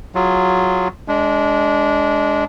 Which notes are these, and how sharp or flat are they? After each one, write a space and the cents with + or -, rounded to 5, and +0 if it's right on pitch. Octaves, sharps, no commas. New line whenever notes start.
F#3 +0 F4 -5 G#4 +0
G#3 +5 D4 -20